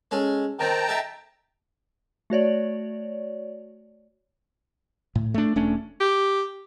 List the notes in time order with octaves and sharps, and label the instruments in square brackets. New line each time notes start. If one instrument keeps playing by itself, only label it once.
[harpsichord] G#3 C#4 A4
[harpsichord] D#3 C4 [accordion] G5 A5 A#5
[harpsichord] D#4 A4 E5
[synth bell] A3 F#4 C#5 D5
[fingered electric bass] A2
A3 D4
E1 A3 C#4 D4
[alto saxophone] G4